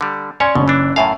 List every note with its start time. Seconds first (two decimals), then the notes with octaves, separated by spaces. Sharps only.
0.01 D3 G3
0.40 C#4 C#5 D5 G#5 C6
0.55 F#1 B2 C#4
0.68 E3 D4
0.96 F#2 A2 E5 F5 G#5 A5